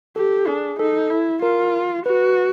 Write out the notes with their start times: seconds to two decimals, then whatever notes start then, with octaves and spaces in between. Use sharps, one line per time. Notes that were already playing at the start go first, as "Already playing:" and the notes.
0.16 G4 A4
0.47 D4 G#4
0.79 D#4 A4
1.10 E4
1.42 F4 A#4
2.06 F#4 B4